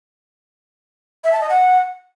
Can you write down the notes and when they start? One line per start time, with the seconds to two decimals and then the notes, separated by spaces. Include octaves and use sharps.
1.24 E5
1.32 A5
1.41 D#5
1.49 F#5